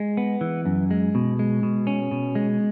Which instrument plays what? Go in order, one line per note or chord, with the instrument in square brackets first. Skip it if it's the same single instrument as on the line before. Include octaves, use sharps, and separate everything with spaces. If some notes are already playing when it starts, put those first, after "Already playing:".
Already playing: [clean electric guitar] G#3
B3
E3
F#2
G#3
B2
G#3
B2
C#4
B2
G#3